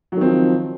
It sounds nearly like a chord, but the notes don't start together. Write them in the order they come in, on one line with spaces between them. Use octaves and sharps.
F#3 D#3 C4 F3